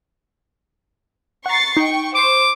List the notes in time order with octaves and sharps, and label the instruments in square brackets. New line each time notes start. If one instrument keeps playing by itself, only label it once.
[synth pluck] F#5 A#5 [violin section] C#6 A6 C7
[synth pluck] D#4 [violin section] G5 C#6
[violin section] C5 [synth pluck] C#6 C7 D7 [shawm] D6